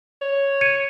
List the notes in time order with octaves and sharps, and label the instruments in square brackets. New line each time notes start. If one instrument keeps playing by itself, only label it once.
[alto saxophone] C#5
[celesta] G#6 C#7 D#7